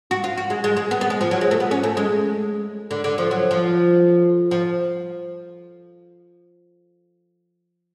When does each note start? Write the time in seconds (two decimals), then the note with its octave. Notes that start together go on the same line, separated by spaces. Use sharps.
0.11 F#4
0.24 F4
0.37 F#4
0.50 G#3
0.64 G#3
0.77 G#3
0.91 B3
1.01 B3
1.10 G#3
1.21 F3
1.31 F#3
1.41 G#3
1.51 A3
1.60 B3
1.71 C#4
1.83 A3
1.97 G#3
2.91 D3
3.04 D3
3.18 F3
3.31 F#3
3.51 F3
4.51 F3